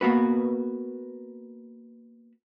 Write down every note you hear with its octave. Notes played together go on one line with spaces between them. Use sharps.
A#3 B3 F#4 B4